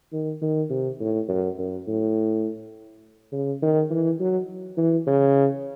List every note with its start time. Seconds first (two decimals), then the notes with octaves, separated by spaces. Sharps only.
0.13 D#3
0.42 D#3
0.70 C3
1.00 A2
1.28 F#2
1.59 F#2
1.87 A2
3.32 C#3
3.62 D#3
3.91 E3
4.20 F#3
4.77 E3
5.07 C#3